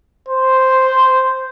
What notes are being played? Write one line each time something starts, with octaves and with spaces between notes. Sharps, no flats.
C5